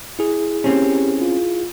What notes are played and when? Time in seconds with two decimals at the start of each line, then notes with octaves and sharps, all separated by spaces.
0.19 E4 G#4
0.64 A#3 C4 C#4 G4
1.20 F4